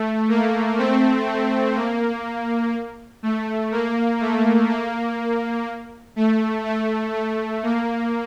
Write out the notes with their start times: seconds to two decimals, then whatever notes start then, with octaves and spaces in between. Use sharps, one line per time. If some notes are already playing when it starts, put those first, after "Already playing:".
Already playing: A3
0.29 A#3
0.78 A3 C4
1.26 A3
1.75 A#3
3.23 A3
3.71 A#3
4.20 A3
4.70 A#3
6.16 A3
6.65 A3
7.14 A3
7.63 A#3